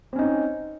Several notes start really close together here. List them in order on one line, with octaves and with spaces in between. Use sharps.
C4 C#4 D#4